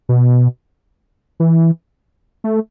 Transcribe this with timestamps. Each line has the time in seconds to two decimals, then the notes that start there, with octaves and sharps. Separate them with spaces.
0.09 B2
1.40 E3
2.44 A3